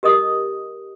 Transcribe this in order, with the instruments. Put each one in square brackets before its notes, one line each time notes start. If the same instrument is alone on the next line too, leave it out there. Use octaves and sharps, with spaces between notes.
[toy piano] G4 A#4 D#5 D#6